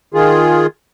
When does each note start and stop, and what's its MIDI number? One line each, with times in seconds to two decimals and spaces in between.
0.14 0.66 51
0.14 0.66 65
0.14 0.66 68